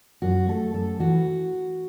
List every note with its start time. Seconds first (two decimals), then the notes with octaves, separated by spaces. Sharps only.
0.22 F#2 F#4
0.48 A3 A4
0.74 F#2 A4
0.99 E3 F#4